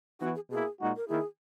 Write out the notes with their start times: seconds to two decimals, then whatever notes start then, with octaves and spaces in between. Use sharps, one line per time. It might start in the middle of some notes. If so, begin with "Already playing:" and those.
0.20 E3 B3 D#4 F#4
0.35 G#4
0.50 B2 A#3 E4 G#4
0.79 A#2 G#3 D#4 F#4
0.96 A#4
1.08 D#3 A#3 E4 G#4